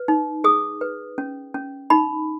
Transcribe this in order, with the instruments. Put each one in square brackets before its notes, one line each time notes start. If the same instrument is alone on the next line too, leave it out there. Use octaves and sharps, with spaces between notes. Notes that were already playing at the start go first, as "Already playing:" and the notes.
Already playing: [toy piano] B4
D#4
G#4 D#6
B4
C#4
C#4
D#4 B5